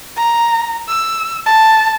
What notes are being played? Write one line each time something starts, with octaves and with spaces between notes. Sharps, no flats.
A#5
E6
A5